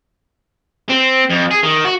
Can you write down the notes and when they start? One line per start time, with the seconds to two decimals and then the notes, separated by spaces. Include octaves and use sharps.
0.90 C4
1.30 F2
1.51 G#4
1.63 D#3
1.85 F#4